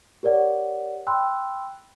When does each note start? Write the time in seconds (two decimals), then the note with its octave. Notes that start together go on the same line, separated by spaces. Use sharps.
0.23 G4 A#4 C#5 D5 F#5
1.07 G5 B5 C6 E6 F#6